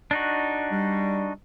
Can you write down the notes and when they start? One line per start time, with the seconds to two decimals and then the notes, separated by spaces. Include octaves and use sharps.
0.11 D4 D#4 F#4
0.71 G3